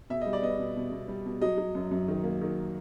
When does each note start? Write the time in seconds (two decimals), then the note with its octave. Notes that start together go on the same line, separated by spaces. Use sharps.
0.10 B2 E5
0.21 G3 D#5
0.33 D5
0.42 B3 D#5
0.59 B2
0.76 B2
0.92 B2
1.08 G3
1.26 B2
1.42 F#3 D#5
1.58 F#3
1.75 F#2
1.91 F#2
2.08 D#3
2.24 A#3
2.41 D#3